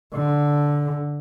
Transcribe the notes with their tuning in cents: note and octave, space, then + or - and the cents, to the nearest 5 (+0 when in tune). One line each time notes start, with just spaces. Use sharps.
D3 -5